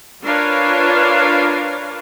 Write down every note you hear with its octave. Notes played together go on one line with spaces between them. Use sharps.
D4 F4 A#4 B4 C#5 F5